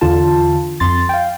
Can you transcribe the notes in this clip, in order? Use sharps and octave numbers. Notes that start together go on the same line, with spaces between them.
E2 D3 F4 A5
F2 C6 A6
F5 G5